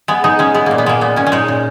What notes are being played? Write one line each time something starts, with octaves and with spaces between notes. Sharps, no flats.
G#3 B3
G#3 D#4
G#3 C#4
G#3 B3
A#2 A#3
B3
G#3 A#3
A#2 B3
A#2 C#4
C#4
G#3 D#4
A#2